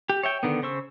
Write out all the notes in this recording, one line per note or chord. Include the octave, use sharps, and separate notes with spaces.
G4
C#5 E5 G5
D3 D#3 B3
C#3 C5 C#6 E6